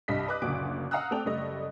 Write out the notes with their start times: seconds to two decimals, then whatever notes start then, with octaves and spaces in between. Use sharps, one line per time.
0.08 C2 G2 D#5 B6
0.28 B4 D#5 D6 D#6 F#6
0.42 F#1 D2 A#2 F#4 D6 D7
0.91 F5 F#5 A#5 D#6 E6 F#6
1.11 A3 C4 A4 D5 G5 F7
1.25 F#1 G3 A3 D#5